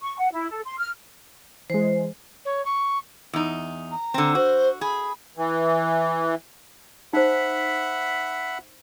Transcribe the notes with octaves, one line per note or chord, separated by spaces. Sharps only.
C#6
F#5
E4
A4
C6
F6
E3 G#3 C5
C#5
C#6
E2 D#4
A#5
D3 C4
F#4 C5
G#4 B5
E3
D#4 C5 E5 F#5 B5